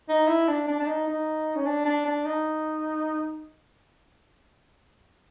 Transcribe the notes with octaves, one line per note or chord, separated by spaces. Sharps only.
D#4
E4
D4
D4
D4
D#4
D#4
C#4
D4
D4
D4
D#4